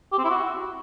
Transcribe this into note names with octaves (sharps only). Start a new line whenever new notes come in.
G4
C4
E4
F#4